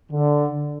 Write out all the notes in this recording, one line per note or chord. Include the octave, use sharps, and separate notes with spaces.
D3